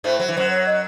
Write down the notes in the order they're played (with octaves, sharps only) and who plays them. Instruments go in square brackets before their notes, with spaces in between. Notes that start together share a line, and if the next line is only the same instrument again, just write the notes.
[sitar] A2 A3 [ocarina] C5
[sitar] F#3 [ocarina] C5
[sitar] E3
[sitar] F#2 F#3 [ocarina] C5
[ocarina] C#5
D#5